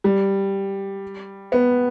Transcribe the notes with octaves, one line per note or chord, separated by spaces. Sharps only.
G3
B3